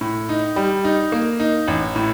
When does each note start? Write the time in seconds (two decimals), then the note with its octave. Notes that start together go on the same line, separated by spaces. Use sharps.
0.01 A2
0.29 D#4
0.56 G3
0.84 D#4
1.12 A#3
1.40 D#4
1.68 A1
1.96 A2